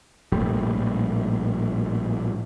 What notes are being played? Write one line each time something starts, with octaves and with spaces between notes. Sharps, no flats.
A#1 A2 G3